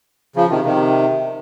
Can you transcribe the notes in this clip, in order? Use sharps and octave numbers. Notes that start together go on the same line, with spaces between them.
C#3 F3
C3 D#3
C3 D#3